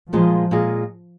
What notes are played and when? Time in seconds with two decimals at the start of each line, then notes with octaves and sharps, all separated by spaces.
0.13 A#2 F3 G#3 F4 G#4 D#5
0.51 A#2 G#3 F4 G#4 D#5